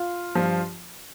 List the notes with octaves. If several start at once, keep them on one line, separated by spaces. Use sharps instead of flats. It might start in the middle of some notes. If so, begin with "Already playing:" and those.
Already playing: F4
G2 F3